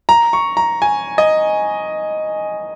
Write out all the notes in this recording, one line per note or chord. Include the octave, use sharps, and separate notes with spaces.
A#5
C#6
A#5
G#5
D#5